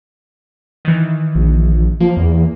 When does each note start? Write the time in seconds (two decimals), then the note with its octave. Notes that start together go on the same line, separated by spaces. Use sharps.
0.85 D#3 E3
1.35 A#1
2.00 F3 A#3
2.17 E2